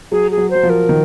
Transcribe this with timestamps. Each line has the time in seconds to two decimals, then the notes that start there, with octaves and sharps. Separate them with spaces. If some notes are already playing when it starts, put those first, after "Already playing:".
0.12 F#3 G#4
0.31 G#4
0.37 F#3
0.50 F#3 C5
0.63 F3
0.69 A#4
0.89 D#3